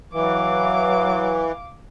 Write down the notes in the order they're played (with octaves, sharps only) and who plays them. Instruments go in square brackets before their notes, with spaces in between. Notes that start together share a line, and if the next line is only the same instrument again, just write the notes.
[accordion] E3 [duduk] F#3 [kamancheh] F5 D6